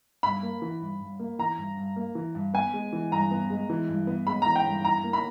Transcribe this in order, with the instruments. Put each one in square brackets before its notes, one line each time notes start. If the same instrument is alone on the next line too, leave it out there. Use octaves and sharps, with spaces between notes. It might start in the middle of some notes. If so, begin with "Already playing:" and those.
[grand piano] G2 [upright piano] B5
[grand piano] A#3
E3
G2
G2
A#3
[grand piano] E3 [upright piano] A#5
[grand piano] G2
G2
A#3
E3
G2
[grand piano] B3 [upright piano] G#5
[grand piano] G#3
E3
[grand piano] G2 [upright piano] A#5
[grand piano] B3
G#3
E3
G2
B3
[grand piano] G#3 [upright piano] B5
[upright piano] A#5
[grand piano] E3
[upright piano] G5
[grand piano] G2
[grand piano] E4 [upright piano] A#5
[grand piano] A#3
[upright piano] B5